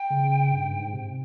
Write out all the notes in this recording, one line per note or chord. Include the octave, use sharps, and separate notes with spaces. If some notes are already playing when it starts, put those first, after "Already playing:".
Already playing: G5
C#3
G2
G#2
C3